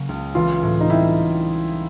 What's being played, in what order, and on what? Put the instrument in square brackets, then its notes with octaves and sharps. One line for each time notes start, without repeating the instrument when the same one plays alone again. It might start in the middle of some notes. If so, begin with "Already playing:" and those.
Already playing: [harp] C#3 F#3 A#3
C#2
[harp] E3 [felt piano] F4
[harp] A2
[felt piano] D#4
[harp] G3 [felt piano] E4